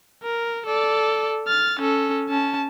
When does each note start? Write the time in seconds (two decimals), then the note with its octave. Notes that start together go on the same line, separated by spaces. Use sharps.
0.23 A#4
0.66 A4 D5
1.47 F6 A6
1.79 C#4 A4
2.29 C#4 A5